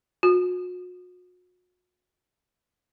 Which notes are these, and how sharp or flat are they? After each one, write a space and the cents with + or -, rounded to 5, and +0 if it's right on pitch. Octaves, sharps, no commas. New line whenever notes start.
F#4 -40